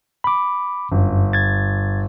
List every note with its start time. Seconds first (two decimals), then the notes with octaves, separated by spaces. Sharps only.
0.24 B5 D6
0.92 G1 F#2
1.33 G#6 A6